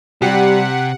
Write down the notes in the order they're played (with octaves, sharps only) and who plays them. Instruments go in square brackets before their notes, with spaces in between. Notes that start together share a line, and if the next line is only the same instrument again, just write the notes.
[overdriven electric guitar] C3 [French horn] G3 [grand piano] G4 [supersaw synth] F#5